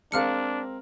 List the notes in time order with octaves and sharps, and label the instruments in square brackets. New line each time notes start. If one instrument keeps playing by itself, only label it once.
[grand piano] G#3 C4 A#4 [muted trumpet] D4 [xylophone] F5 F6 C#7